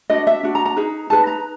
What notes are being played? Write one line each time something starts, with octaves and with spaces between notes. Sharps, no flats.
D4 F#4 B4 D#5
E5
D4 F#4
A#5
A#5
D#4 G#4 B4
D#4 G#4 B4 A5
A#5